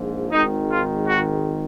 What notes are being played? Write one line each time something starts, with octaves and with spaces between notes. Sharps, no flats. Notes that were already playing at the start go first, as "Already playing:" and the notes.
Already playing: A#1 G#2 F3
G#1 G#2 D#3 D#4
F4
F#4